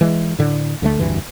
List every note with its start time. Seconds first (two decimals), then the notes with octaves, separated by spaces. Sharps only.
0.01 E3 G#3
0.39 A2 D3
0.82 D2 D3 F3 A3
0.99 F1 D2 G2 E3